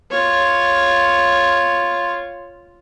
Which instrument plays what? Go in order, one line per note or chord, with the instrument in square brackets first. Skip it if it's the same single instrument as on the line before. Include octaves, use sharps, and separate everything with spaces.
[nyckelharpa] F4 C#5